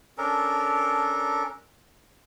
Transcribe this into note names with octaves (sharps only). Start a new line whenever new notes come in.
C#4 D4 A4 A#4